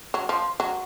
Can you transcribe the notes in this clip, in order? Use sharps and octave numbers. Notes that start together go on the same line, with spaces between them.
F#3
F3
F#3